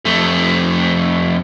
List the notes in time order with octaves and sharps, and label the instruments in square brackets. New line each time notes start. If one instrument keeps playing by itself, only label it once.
[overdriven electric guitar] F2 A3